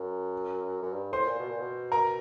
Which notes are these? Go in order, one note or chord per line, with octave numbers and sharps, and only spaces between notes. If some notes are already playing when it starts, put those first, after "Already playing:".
Already playing: F#2
F#2
G2
A2 C5 C6
A#2
B2
A#2
B2
A#4 A#5